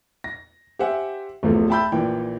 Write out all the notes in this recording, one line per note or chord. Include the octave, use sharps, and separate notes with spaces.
A#6
G4 C5 E5 F#5 G#5
D1 E2 E3 F3 A3
E5 G5 A5 B5 E6 G6
A#1 A#2 E3 G5